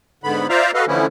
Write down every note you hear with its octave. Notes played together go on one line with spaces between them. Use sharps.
G#2 D3 B3 B5
F4 C5 D5 E5 F5 A#5
F#4 A4 B4 D#5 F5
D3 E3 F3 A3 C#4 E4